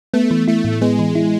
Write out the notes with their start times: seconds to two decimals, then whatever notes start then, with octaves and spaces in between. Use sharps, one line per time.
0.13 A3 B3
0.31 E3
0.48 A3 E4
0.64 A2
0.81 G#3 B3
0.99 E3
1.15 E4